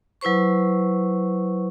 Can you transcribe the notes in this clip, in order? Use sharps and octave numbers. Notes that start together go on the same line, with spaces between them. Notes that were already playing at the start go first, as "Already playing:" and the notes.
F#3 E4 B4 C5 C#6